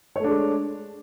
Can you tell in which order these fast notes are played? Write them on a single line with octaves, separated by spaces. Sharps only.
C#5 A3 D4 G#3